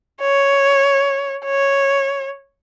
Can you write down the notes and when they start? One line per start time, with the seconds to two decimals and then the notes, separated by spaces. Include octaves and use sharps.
0.21 C#5
1.45 C#5